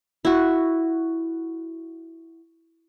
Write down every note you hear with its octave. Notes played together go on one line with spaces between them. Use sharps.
E4 F#4